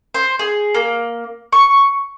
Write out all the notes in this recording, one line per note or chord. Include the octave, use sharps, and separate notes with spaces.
C5
G#4
A#3
C#6